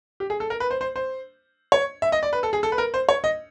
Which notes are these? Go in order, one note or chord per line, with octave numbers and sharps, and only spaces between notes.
G4
G#4
A4
A#4
B4
C5
C5
C5
C#5
E5
D#5
D5
B4
A4
G#4
A4
B4
A#4
C5
C#5
D#5